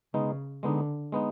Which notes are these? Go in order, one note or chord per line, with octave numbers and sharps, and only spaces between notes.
C#3 G#3 B3 D#4
D3 G#3 B3 D#4
G#3 B3 D#4